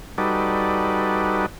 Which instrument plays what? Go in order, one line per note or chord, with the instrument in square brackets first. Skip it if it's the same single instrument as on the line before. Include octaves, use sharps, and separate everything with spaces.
[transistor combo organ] G3 D#4 F#4 A4 B4 D5